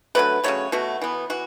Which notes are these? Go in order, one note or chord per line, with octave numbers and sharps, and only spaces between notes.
D3 F#3 A3 B4
C#3 F#3 A3 C#5
B2 A3 F#4
E3 B3
E3 F#4